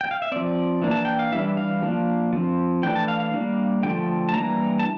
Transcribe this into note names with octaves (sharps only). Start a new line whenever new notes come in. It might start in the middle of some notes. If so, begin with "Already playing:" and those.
G5
F5
E5
F3 C4 D5
E3 A#3 D4
A5
G5
F5
E3 G3 D4 E5
F5
F3 A#3 D4
F3 C4
E3 A3 D4 G5
A5
F5
F5
G3 A#3 D4
D3 F3 A3 G5
A5
E3 G3 A#3 D4 A#5
A5